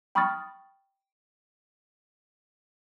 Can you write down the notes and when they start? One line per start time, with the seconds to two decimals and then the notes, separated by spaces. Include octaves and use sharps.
0.15 G5 B5 C#6 D#6 F6 A6